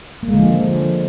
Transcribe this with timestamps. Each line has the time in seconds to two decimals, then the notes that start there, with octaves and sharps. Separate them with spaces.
0.23 A#3
0.28 G#3
0.34 D3
0.39 F3